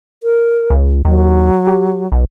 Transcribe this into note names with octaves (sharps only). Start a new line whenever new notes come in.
A#4
C#2
D#2 F#3
G4
B1